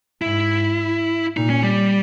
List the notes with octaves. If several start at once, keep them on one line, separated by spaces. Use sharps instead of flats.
G#2 E4
A#2 D#4
C#4
G3